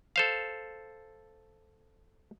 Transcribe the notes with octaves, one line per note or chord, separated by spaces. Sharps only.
A4 C5 F5